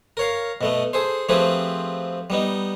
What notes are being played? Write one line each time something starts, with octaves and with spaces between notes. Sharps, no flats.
A#4 C#5 F5
B2 A3 B3
G#4 A4 C5
F3 A3 C4 G4 G#4 B4
G3 B3 D#4